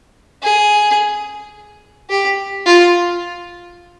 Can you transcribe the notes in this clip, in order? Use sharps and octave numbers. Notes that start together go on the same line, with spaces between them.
G#4
G4
F4